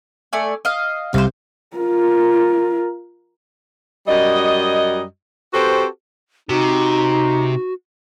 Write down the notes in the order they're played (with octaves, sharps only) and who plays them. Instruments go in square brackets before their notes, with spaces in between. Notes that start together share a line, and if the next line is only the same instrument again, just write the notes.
[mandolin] A3 D5 G#5
D#5 F5
[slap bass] C2 [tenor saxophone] C3 [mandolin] C5 F5
[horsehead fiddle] F4 A#4
[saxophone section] F#2 G3 F#4 D#5
C4 F#4 G4 A4 B4 C5
[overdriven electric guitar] C3 [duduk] D#4 [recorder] F#4